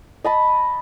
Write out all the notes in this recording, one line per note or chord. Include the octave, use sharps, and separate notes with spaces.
D#5 A5 B5